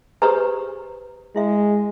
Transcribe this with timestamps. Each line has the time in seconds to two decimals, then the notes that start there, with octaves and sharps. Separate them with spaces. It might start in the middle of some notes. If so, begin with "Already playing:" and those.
0.22 G4 G#4 B4 C5 A#5
1.36 G#3 E4 E5